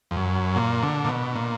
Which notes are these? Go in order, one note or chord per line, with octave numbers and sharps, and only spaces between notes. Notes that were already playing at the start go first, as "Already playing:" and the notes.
F2
F#2
A#2
D3
A#2
B2
A#2